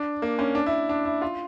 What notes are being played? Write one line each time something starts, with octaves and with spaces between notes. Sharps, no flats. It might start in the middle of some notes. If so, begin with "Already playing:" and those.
Already playing: D4
A#3
C#4
D4
E4
D4
E4
F4